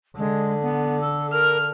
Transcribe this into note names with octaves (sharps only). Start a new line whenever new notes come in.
D3 G#3
B3
A4
A#4 F6